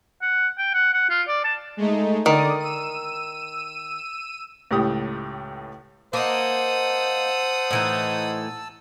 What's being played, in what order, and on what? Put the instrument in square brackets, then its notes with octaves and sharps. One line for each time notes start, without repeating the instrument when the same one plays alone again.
[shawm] F#5
G5
F#5
F#5
F4
D5
A5
[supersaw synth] G#3 A3 D#4
[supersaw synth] D3 D5 D#6 [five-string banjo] D#3
[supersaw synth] E6 D#7
[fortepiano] C#2 A2 G4 D#6
[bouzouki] A#3 D#4 [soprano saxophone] C5 [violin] F#5 D#6 [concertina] A5 E6
[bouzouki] A2 E3 D#4